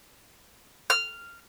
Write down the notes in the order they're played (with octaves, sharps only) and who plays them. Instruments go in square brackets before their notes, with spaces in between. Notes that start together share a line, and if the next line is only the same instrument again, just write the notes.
[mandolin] F6